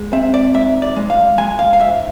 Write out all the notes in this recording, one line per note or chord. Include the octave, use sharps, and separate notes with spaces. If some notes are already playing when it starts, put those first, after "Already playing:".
Already playing: G#3
C4 E5
D5
G#2 E5
D5
G#3
F5
G#3 G#5
F5
F5
G#2 E5